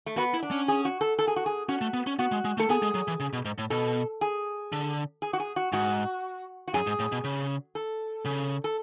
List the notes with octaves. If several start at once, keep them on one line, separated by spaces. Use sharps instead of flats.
A3
B3 F#4
E4
D4
C#4
G#4
F#4
A4
A4
G#4
F#4
G#4
C#4 F#4
A3
B3
C#4
B3 F#4
G#3
G#3
A3 A4
B3 G#4
G#3
F#3
E3
C#3
B2
G#2
A2
B2 A4
G#4
D3
G#4
F#4
G#4
F#4
G#2 F#4
F#4
F#2 G#4
G#2
A2
B2
C#3
A4
C#3
A4